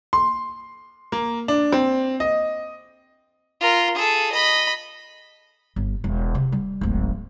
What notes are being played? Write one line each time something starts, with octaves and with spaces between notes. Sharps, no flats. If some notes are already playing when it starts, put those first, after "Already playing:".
C6
A#3
D4
C4
D#5
F4 A#4
G#4 A4
D#5 B5
G1
E1
C3
G3
D1 G#1